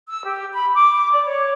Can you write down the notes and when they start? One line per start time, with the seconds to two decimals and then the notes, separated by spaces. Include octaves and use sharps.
0.08 E6
0.25 G4
0.52 B5
0.73 D6
1.11 D5
1.25 C#5